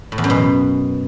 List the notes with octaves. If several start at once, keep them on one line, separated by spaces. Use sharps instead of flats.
A2
E2
F#2
B2